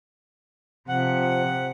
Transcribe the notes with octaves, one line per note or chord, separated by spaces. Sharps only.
C3 F3 F#5